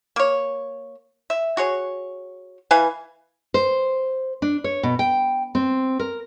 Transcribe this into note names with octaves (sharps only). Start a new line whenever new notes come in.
A#3 C#5
E5
F#4 G#4 C#5
E3 B4 F5 G#5
C5
D4
C#5
B2
G5
C4
A#4